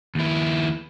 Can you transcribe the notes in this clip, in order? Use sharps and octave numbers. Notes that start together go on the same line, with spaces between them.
D#2 E4